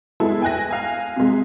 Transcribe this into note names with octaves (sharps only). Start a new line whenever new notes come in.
G#3 B3 E4 A4
G5 G#5 F#6 A#6
F5 G#5
C3 G#3